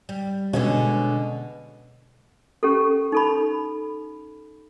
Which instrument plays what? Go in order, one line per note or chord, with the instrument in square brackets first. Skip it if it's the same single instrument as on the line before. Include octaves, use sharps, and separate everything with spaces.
[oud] G3
[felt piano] B2 [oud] D3 G#3 C#4
[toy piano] C#4 G4 A4
D#4 A4 B5